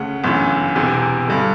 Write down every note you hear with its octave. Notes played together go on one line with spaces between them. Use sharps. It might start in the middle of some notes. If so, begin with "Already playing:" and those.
Already playing: D2 C#3 F#5
G1 F#2 C#3 E3
E1 E2 C3 E3
G2 D3